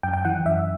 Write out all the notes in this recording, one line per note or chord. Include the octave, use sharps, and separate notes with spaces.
F#2 G5
G5
E3 F#5
F#2 E5